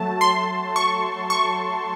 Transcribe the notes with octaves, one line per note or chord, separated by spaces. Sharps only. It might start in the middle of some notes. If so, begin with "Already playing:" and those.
Already playing: F#3 A3 A5
C6
C#6
C#6